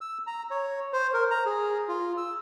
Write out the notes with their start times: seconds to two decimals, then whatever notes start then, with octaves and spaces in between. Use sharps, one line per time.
0.01 E6
0.27 A#5
0.51 C#5
0.93 C5
1.13 A#4
1.31 A#5
1.46 G#4
1.88 F4
2.17 E6